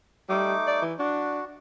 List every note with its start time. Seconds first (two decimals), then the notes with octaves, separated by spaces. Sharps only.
0.29 G3 A3 D#4 D6
0.67 D5
0.82 E3
0.99 D4 F#4